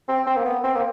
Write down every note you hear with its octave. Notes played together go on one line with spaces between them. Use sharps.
C4
C4
A#3
B3
C4
A#3